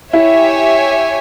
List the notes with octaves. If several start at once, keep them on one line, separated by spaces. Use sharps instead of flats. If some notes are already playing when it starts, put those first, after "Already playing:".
E4 G4 C#5 E5 G#5